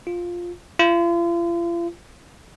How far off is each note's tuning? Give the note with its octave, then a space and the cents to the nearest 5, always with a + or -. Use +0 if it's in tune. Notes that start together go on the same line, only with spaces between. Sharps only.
F4 +5
F4 -40